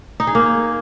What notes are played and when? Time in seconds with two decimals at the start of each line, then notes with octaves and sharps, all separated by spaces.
0.20 D#4
0.27 G#4
0.35 A#3